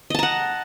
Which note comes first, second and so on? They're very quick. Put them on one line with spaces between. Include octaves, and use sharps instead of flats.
D#5 A5 A#5 F#5